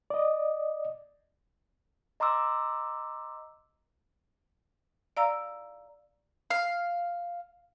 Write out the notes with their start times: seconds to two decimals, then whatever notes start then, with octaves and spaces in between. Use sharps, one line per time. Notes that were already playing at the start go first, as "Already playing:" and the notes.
0.10 D5 D#5
2.20 D#5 A#5 C6 D6 E6
5.17 D5 F5 A#5 E6
6.50 F5